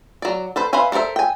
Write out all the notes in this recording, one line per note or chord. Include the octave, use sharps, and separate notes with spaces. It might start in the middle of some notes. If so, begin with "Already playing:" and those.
F#3 D5
A4 B4 C5
B4 C5 E5 F5 G#5
B3 A4 A#4 C5 E5
G5 G#5